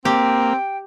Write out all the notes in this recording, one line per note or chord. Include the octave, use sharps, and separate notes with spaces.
A#3 C4 G4 G5